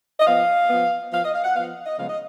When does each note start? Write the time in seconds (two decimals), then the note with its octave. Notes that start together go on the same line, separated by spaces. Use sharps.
0.19 D#5
0.26 F3 B3 F5
0.70 F3 B3
1.12 F3 B3 F5
1.23 D#5
1.34 F5
1.44 F#5
1.55 F3 B3 F5
1.86 D#5
1.98 C#3 F3 G#3 B3 F5
2.09 D#5